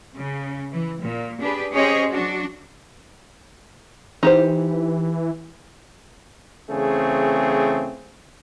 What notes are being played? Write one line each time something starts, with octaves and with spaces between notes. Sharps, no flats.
C#3
E3
A#2
D4 G4 G#4 B4
C#4 G4 G#4 C5 C#5 D#5
F#3 D4 F#4
E3 D#4 G4 C5
C#3 E3 A3 C4 G#4